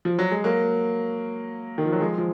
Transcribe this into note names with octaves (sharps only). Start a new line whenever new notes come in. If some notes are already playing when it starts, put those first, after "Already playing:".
F3
F#3
G#3
F#3 A#3
D#3
F3
F#3
F3 G#3
F3